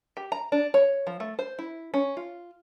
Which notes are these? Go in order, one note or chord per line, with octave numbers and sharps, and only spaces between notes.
G4
A#5
D4
C#5
F3
A3
C5
E4
C#4
F4